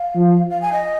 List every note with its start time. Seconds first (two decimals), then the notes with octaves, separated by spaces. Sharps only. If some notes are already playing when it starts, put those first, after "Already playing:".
Already playing: F5
0.15 F3
0.49 F5
0.61 G#5
0.72 D#5